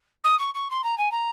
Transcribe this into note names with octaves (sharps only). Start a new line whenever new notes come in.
D#6
C#6
C#6
C6
A#5
G#5
A#5